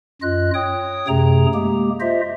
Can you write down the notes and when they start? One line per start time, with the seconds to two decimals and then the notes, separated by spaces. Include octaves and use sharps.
0.22 F#2 F4 D#5 F#6
0.54 C#5 G5 D#6
1.08 F#2 C3 A3 G#4 A#5
1.54 G#3 A#3 G4
2.00 F4 C5 D#5 E5